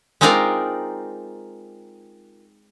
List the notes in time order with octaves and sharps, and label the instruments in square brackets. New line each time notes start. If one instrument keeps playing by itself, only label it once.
[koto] G#3 C4 D#4 F4 A#4 D5